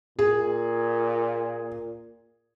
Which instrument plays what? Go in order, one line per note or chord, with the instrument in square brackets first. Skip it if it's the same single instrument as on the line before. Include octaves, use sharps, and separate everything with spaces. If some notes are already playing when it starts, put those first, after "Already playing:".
[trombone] A#2 [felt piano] G#4